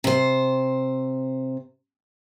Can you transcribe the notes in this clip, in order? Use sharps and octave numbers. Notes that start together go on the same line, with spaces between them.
C3 C5